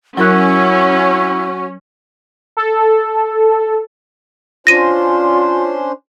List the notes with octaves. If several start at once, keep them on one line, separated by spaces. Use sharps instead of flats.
F#3 C#4 E4 F#4 A#4 F#6
A4
C#4 D4 F4 C5 A#6 D#7